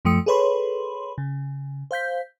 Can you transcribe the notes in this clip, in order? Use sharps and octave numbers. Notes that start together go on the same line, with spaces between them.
F#2 F3 A3 G5 D#6 C#7
G#4 A4 B4 C#5 B5 C6
C#3
C5 F5 G6 B6